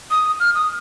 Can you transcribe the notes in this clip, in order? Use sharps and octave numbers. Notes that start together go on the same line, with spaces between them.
D#6
F6
D#6